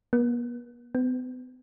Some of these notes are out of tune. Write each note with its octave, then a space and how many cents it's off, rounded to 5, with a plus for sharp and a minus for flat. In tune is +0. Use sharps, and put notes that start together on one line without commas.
B3 -45
B3 +40